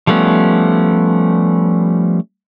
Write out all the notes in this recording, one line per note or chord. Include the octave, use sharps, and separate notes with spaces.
F3 G3 A3 B3 C#4